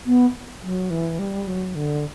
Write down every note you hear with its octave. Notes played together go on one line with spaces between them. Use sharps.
B3
F#3
E3
G3
F#3
D3